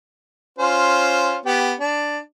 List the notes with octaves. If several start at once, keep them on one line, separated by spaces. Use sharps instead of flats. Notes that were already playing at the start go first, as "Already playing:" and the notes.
C#4 F4 C5
B3 G4
D4